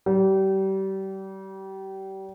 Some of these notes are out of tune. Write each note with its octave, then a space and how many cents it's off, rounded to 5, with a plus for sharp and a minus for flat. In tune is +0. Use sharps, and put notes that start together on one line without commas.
G3 -30